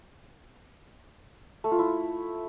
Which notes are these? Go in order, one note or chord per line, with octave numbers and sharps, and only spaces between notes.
A3
F4
E4